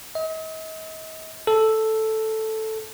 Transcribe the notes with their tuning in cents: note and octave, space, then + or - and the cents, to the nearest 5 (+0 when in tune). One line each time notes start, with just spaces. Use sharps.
D#5 +40
A4 +0